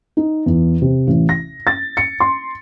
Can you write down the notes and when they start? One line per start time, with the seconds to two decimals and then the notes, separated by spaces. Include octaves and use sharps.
0.17 D#4
0.46 E2
0.82 C3
1.07 A1
1.29 A#6
1.67 A6
1.97 C#7
2.20 C6